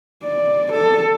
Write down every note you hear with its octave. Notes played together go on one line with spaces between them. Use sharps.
D5
A4